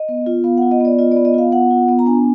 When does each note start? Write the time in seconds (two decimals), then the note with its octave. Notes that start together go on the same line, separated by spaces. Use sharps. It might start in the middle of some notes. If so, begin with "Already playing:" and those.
Already playing: D#5
0.09 B3
0.26 F4
0.44 B3 F5
0.57 F#5
0.62 F4
0.71 D#5
0.80 B3 D5
0.99 F4 D#5
1.12 D5
1.17 B3
1.25 D#5
1.34 F4 F5
1.52 B3 F#5
1.71 F4
1.88 B3
1.99 A#5
2.06 D4 G#5